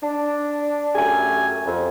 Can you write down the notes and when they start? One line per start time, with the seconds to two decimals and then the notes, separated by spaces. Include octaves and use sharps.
0.02 D4
0.96 F#2 A3 G4 G#5
1.65 F2